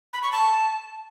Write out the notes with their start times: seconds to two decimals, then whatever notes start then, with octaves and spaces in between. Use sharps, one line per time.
0.13 B5
0.23 C#6
0.32 A5